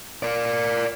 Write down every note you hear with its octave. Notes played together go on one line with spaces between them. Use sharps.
A#4 D5